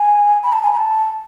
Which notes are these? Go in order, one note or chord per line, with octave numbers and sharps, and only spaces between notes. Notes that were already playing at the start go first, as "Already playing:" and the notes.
Already playing: G#5
B5
A5
G#5
B5
A5